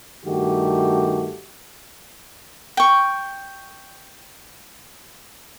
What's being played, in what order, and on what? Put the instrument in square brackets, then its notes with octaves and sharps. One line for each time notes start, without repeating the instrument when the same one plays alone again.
[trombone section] G2 D#3 A3 F#4 G4
[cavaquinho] G5 C#6